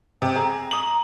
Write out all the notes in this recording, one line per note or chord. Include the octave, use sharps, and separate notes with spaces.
C3 G5
G#4 A#5
D#6 F#7